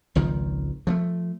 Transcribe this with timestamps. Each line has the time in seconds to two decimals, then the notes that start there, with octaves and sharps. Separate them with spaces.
0.15 G#1 C#2 D#3 F3
0.87 F3 G#3 A3